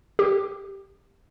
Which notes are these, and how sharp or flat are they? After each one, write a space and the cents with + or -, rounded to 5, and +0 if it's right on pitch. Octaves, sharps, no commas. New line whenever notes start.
G4 +5